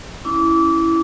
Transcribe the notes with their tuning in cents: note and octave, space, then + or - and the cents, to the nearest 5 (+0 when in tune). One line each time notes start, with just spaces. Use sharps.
C#4 +0 E4 +0 D6 -25